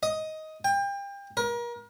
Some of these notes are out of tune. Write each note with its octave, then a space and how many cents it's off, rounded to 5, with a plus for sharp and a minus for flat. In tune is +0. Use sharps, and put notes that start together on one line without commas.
D#5 +10
G5 +30
A#4 +35